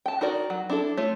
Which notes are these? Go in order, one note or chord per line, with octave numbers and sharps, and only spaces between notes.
G5 A5
D#4 F#4 A#4 D5
F#3
D4 E4 A4
A3 F4 C#5